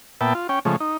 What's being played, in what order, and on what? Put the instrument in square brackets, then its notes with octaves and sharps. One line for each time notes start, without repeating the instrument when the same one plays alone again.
[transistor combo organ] A#2 B3 E5 G5 A5
F4
C#4 G5
C#3 F3 G#3 A3
D#4